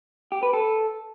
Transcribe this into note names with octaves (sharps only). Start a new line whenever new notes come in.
G4
B4
A4